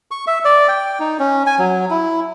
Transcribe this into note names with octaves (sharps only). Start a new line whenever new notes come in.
C#6
E5
D5
G5
D#4
C#4
G#5
F#3
E4